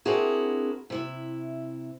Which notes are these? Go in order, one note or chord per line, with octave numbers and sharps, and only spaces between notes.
C4 D4 E4 F#4 G#4 A#4
C3 E4 E5